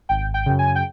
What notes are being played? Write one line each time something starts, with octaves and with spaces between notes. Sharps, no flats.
G#1 G5
G5
F#2 C#3
G#5
G5